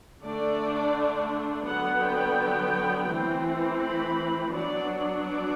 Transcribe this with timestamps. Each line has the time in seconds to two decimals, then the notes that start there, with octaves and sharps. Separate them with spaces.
0.24 D3 A3 D4 D5
1.66 D3 F#3 B3 F#5
2.03 G5
3.08 E3 A3 C4
3.81 B5
4.51 F#3 B3 D4 D5
5.23 D5